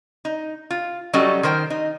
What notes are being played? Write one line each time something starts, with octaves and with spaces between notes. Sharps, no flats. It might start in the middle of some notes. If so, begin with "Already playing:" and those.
D#4
F4
F#3 G3 C#4 F#4 A4 D#5
D#3 A#4 C5 G5
D#4